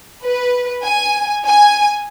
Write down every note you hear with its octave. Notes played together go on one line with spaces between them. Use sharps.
B4
G#5
G#5